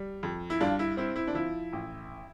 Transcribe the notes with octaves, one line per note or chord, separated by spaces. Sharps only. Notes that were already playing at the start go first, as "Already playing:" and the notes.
Already playing: G3
F2
E4
G2 D4 F4
E4
C4 E4
E4
D4
F3 E4
A1